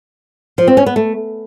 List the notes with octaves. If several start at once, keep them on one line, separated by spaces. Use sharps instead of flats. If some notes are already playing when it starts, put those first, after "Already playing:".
F3
C4
C#4
B3
A3